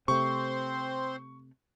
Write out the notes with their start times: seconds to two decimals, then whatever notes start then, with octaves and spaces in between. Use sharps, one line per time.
0.08 C3 A3 C4 C5 C6 C#6